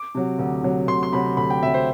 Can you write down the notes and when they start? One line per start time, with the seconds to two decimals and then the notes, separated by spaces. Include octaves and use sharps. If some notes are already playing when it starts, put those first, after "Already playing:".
Already playing: D6
0.15 C3 F#3
0.39 D2
0.63 C3 F#3
0.88 D2 C6
1.03 C6
1.12 C3 F#3 B5
1.37 D2 B5
1.50 G5
1.63 C3 F#3 E5
1.74 C5